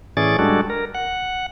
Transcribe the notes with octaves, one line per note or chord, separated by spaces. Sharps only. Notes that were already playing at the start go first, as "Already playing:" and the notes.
A2 E3 C#4 G#4 D5 A6
G3 G#3 D4 F#4 A4
A#4
F#5